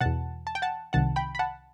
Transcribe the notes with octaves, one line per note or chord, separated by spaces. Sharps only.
E2 B2 F#5 A5
A5
G5
F#5 A5
C2 C3 D#3 F#5 A5
G5 B5
B5
F#5 A5